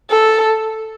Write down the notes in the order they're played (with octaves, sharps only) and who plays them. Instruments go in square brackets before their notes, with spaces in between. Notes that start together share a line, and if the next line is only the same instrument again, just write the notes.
[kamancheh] A4